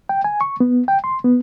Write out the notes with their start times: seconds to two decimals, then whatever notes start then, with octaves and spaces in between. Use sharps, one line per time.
0.09 G5
0.24 G#5
0.41 C#6
0.60 B3
0.88 G5
1.04 C6
1.25 B3